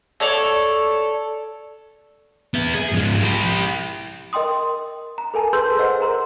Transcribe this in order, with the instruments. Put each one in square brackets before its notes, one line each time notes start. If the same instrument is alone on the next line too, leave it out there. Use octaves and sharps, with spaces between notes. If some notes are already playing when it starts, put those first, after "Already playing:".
[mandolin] A4 C#5 D5 C#6
[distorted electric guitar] B3 E5
G#4
G#2 F3
E4 G4
[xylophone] A#4 D#5 G5 C6 D#6
A#5
A4 A#4 G#5 A5
G#4 B4 C6 E6 G6
C5 D#5 F#5
A#4 A#5 C6